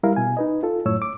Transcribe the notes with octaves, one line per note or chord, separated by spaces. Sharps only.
G3 E4 A#4 F5
B2 G#5
D#4 B4 D#5
F4 A4
F#2 A2 C#5 E6
D6